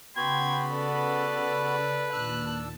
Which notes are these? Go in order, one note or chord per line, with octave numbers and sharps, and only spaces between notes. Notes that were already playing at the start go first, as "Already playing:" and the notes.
C#3 B3 F#4 G5 B5 C6 G#6
A4 B4 D5
D#2 A#2 D4 A5 E6 F#6